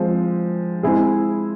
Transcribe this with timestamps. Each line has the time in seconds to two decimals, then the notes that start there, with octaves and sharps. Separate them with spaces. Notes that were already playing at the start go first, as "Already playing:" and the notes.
Already playing: F3 G#3 C4
0.83 G#3 C4 E4 G#4